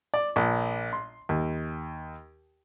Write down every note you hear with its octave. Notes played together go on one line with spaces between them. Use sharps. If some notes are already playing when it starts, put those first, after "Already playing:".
D5
A#1
C6
D#2